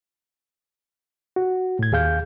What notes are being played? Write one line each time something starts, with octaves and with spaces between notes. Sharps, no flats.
F#4
A2 G#6
D#2 G#4 F5 G6